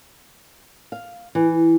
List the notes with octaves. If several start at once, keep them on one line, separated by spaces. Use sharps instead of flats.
F5
E3